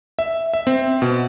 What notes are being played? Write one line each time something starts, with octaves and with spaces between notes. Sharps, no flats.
E5
E5
C4
B2